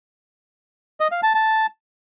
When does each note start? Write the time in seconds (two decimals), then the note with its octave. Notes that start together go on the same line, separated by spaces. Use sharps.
1.00 D#5
1.12 F5
1.23 A5
1.34 A5